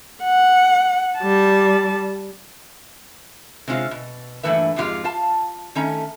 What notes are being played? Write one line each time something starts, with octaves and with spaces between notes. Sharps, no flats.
F#5
G3 A5
C3 G#3 C4 C#4 F4
B2
G2 A#2 E3 A3 B4 E5
F2 G#2 G#3 F4 G4 F5
F4 F5 A5
D#3 A3 C#4 A#5